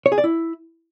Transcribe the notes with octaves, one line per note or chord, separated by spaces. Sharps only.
C#5
G#4
D5
E4